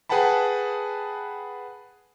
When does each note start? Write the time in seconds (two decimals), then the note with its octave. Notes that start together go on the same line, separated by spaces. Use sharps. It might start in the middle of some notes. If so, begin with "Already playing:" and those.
0.09 G#4 B4 F#5 G5 A5 B5